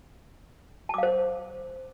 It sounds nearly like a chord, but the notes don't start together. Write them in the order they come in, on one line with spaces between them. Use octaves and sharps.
A5 D6 F5 C5